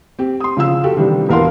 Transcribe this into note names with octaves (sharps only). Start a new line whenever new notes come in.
C4 G4
C6 D#6
C#3 F3 F5 E6
F#4 G4 A4
C3 D#3 E3 G3 D4
E1 E2 A#4 F5 F#5 C6